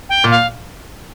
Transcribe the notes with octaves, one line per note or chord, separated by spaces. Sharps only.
G5
A#2
F5